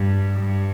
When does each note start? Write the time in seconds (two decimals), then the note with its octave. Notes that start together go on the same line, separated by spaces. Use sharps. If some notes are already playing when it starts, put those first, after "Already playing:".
Already playing: G2
0.39 G2